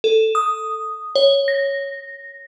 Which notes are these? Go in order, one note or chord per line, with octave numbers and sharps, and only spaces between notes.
A4
D#6
C#5
A#6